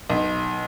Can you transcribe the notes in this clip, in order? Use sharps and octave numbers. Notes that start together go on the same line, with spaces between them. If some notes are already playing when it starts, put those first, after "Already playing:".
B1